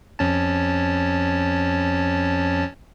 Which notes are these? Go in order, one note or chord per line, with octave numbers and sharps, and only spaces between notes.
F2 C#4 A5